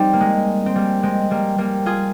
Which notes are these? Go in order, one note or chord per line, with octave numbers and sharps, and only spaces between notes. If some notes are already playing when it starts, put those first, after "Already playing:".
Already playing: G3 C4 D#4
A#3
G#3
C4
G3 A#3
G#3 C4
G3 A#3
G3 A#3
F4 G#4